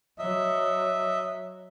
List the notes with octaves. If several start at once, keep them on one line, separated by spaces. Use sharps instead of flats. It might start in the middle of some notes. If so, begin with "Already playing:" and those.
F#3 D#5 E5